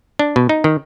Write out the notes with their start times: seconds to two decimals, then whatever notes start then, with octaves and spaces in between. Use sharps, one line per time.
0.19 D4
0.36 B2
0.49 D#4
0.64 D#3